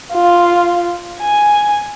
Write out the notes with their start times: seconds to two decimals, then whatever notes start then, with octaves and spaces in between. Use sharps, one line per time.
0.14 F4
1.20 G#5